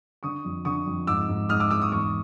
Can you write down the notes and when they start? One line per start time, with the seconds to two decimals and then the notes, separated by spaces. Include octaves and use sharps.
0.23 D3 C#6 D#6
0.45 F2
0.65 D3 C#6 D#6
0.86 F2
1.07 G#2 D6 E6
1.29 G#2
1.49 G#2 D#6 F6
1.60 D6 E6
1.70 G#2 D6 E6
1.81 C#6 D#6
1.92 E2 C#6 D#6